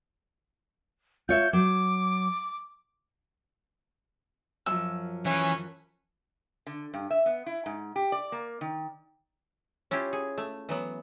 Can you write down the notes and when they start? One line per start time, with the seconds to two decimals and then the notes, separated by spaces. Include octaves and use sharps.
1.29 F4 C#5 E5 G6
1.53 F#3 D6
4.66 F#2 F3 E6
5.25 E3 C#4
6.67 D3
6.94 G2
7.11 E5
7.26 B3
7.46 E4
7.66 G#2
7.96 G4
8.12 D5
8.32 A#3
8.61 D#3
9.91 C#4 E4 F4 G4
10.13 G#4
10.38 A3
10.69 E3 F#3 B3